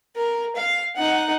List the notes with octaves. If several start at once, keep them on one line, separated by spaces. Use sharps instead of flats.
A#4
F5
D#4 F#5